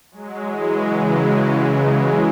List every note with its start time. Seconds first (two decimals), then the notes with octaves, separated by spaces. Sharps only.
0.11 F#3 G#3
0.45 E3 F#3
0.78 C#3